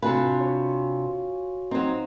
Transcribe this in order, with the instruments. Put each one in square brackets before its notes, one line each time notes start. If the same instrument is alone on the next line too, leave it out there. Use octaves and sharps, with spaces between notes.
[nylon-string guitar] C3 D4 B4 [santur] F4 G#5 [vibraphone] F#4
[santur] C#5
[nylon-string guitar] F#3 C4 [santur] D#4 C5